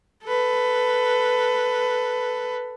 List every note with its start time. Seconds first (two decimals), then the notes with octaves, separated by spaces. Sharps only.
0.24 A4 B4